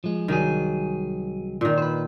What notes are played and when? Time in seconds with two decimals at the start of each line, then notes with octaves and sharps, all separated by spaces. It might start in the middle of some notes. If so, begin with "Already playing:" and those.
0.04 F3 G#3
0.28 C2 D#3 F#3 G#4
1.61 A#2 D#3
1.78 B4 C5